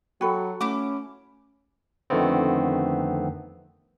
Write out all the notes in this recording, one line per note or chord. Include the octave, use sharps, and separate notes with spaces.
F#3 F#4 A4 G5 B5
A3 C#4 E4 D6
F2 D3 D#3 A3 B3 C4